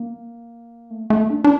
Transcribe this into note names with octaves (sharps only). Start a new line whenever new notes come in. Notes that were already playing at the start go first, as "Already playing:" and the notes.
Already playing: A#3
A3
A3
D4
D4